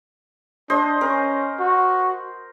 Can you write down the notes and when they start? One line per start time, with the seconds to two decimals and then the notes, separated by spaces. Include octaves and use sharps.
0.70 D4 C5 D#5
1.01 C#4 A#4
1.60 F#4